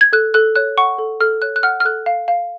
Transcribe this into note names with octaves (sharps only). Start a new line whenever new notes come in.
G#6
A4 F#6
A4 F#6
C#5 F#6
F#5 C#6
A4
A4 F6
C#5 F#6
F#6
F#5 F6
F6
A4 F#6
F5
F5